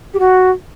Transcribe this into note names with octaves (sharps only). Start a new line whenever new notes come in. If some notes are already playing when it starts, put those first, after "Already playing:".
G4
F#4